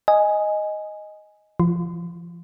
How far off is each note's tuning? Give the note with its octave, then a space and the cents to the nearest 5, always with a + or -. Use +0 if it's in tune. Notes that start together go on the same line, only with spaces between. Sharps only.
D#5 +0 G#5 +0
F3 -35 F4 +0